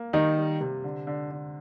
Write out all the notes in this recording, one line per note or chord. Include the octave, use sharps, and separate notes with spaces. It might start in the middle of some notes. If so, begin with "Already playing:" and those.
Already playing: A#3
D#3 G3 D#4
G3
C3
D3
D3
D3